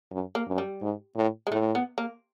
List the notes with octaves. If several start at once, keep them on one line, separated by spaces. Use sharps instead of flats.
F#2
A#3
F#2
G3
G#2
A2
G#3
A2 A3
B3
A#3